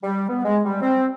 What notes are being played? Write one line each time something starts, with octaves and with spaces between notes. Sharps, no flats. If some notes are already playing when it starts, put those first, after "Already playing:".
G3
B3
G#3
G3
C4